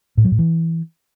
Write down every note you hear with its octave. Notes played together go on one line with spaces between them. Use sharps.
A2
F#3
A2
E3